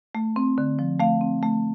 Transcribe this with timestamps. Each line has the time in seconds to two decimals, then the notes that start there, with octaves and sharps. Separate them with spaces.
0.15 A3
0.36 C4
0.58 D3
0.79 F3
1.00 A3 F5
1.21 C4
1.43 A3